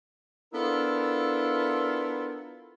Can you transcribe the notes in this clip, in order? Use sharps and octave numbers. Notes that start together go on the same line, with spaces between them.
B3 D4 E4 F4 A4 A#4